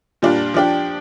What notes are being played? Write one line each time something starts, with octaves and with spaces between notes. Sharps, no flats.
A#2 G3 D4 F4
F3 D4 G4